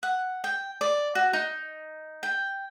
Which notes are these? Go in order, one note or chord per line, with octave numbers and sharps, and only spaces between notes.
F#5
G5
D5
F#4
D#4
G5